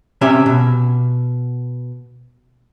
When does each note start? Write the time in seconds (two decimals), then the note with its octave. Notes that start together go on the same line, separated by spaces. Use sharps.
0.21 C3 C#4 G4 E5
0.46 B2